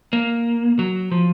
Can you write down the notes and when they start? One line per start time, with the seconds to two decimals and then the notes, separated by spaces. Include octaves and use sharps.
0.13 A#3
0.79 F#3
1.11 F3